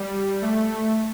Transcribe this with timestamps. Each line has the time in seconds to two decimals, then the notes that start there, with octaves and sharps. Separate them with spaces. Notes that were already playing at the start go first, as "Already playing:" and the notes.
Already playing: G3
0.42 A3